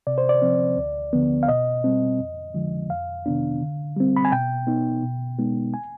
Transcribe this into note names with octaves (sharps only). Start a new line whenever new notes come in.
C3 D5
C5
D5
F3 C4
D2
D3 F3 B3
F5
B2 D#5
G3 C4
F2
D3 F3 G#3
F2 F5
C3 D#3 B3 D4
D3
G3 C4
B5
G#5
B2 G5
B3 D#4
B2
G#3 B3 D#4
G#5